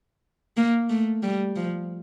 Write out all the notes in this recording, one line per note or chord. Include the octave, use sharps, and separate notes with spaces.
A#3
A3
G3
F3